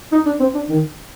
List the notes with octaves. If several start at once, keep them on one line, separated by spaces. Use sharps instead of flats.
D#4
D4
C4
D4
D#3